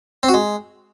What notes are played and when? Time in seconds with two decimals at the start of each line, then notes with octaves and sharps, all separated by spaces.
0.23 C4
0.29 F#4
0.34 G#3